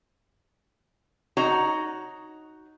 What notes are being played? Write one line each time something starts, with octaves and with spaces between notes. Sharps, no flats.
D#4 F#4 C#5 A#5